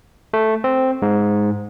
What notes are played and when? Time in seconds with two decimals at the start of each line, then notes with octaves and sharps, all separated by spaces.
0.33 A3
0.64 C4
1.02 G#2